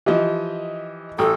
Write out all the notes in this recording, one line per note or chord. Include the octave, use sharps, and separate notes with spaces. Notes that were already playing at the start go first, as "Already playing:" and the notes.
E3 F3 G4 D#5
A1 A4 G5 D#6